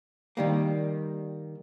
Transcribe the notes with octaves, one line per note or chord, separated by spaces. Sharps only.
D#3 G3 A#3